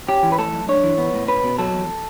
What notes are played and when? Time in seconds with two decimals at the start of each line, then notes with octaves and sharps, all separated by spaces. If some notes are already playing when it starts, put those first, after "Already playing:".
0.08 C#4 G4
0.23 E3
0.32 B4
0.38 A3 A4
0.53 F#2
0.69 D4 C#5
0.84 E3
0.98 B3
1.14 A2
1.28 C#4 B4
1.44 B2
1.58 F#3 A4
1.73 E2